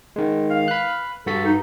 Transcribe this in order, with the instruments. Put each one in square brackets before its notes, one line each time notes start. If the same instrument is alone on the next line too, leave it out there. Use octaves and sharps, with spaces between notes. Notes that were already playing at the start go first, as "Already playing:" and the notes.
[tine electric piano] D#3 G#3
[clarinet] F5
[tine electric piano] B5 F#6
[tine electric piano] G2 F#4 B6 [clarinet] A4
[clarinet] D#4